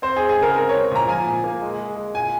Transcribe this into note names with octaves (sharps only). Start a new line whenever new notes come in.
C4 C5
G#3 G#4
G#4
C#3 A#4
C4 A#4
C4 C#5
A#2 A#5
F3 G#5
A#2
A#3
G#3
G#3
G#3
A#2 G#5